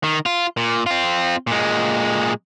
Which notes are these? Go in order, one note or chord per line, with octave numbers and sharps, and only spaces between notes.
D#3
F4
A#2
C4 F4
A#2 G#3